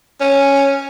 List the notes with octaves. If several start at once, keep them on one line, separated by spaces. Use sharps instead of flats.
C#4